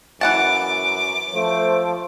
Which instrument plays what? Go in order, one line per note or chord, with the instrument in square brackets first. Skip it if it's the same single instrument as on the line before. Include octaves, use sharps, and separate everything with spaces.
[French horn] F#2 [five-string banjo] E3 F#5 A5 [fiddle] D6
[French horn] F3 [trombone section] A3 C5